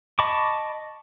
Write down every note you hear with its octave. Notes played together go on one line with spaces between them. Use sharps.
D#5 A5 B5 C#6 D6